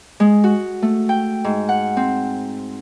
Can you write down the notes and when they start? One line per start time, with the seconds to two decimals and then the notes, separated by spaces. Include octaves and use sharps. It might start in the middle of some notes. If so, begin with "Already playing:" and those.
0.20 G#3
0.44 F#4
0.82 A3
1.09 G5
1.44 G#2
1.69 F#5
1.97 C4